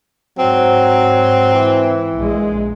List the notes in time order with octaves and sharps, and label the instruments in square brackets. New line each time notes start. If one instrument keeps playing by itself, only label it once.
[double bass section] G#2 [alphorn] F#3 [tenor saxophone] C4
[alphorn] E3
[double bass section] A#1 A#2 G#3